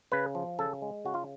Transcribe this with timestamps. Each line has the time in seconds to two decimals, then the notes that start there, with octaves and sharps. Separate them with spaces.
0.12 C#3 B4
0.35 F3
0.59 C#3 A4
0.82 G#3
1.05 C#3 F#4
1.14 F4